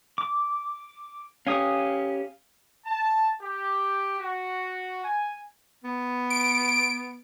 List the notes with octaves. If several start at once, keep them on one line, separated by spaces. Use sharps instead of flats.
D6
C#4 G4 F5 G#5 D#6
A5
G4
F#4
G#5
B3
D7